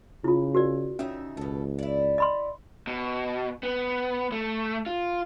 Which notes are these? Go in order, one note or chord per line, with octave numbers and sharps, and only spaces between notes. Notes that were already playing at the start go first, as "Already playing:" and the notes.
C#3 E4 F4
F#4 A#4 D5
C#3 C#4 D#4 E5
C#2 B2 A4
E4 D5
D#5 B5 C6
B2
B3
A3
F4